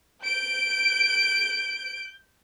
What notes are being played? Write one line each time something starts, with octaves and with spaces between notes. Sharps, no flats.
G6 D7